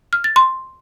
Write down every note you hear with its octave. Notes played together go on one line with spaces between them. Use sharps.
F6
A6
C6